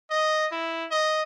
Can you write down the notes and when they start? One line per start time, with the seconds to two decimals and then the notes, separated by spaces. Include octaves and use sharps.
0.10 D#5
0.51 E4
0.91 D#5